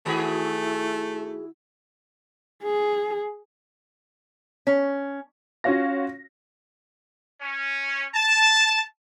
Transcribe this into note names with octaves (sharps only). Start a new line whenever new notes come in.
D#3 A3 E4 F#4 G#4
G#4
C#4
C#4 F4 F#4 C#5 F5 A#6
C#4
A5